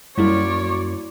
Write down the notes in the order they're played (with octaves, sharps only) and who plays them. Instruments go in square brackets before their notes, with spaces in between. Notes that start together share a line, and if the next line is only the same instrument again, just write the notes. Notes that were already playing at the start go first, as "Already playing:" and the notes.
[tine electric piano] F#2 A#3 [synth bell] G3 E4 F#4 [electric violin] C#5 D5